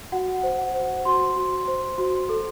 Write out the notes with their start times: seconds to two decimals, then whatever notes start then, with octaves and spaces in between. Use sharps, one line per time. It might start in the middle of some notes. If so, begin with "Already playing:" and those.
0.12 F#4 F#5
0.43 C5
0.58 F#5
0.74 C5
1.05 F#4 C6
1.36 F#4
1.68 C5
1.98 F#4
2.29 A4